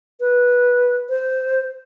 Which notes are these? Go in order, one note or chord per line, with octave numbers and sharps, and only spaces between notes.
B4
C5